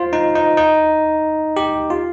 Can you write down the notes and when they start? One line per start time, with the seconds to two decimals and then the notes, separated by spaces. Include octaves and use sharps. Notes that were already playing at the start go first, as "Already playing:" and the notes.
Already playing: F4 C5
0.13 D#4
0.35 D#4
0.57 D#4
1.57 G4
1.90 F4